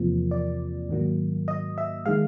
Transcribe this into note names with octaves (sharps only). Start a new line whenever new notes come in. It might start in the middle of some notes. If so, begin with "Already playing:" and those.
Already playing: E2 C3 F3 A#3
D5
G#2 D#3 F#3 A#3
D#5
E5
D#3 G#3 F5